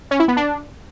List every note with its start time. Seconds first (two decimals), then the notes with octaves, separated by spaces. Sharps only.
0.11 C#4
0.20 E4
0.28 B3
0.37 D4